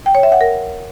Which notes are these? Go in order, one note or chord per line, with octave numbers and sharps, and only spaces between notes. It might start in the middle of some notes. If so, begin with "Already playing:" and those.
G5
C#5
E5
F#5
A#4